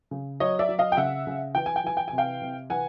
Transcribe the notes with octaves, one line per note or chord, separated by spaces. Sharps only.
C#3
F#3 C#5 D#5
D5 E5
F#3
D#5 F5
G5
C#3 E5 F#5
C#3
E3 G5
G#5
G5
E3 G#5
G5
G#5
C3
F5 G5
C3
E3 F#5 G#5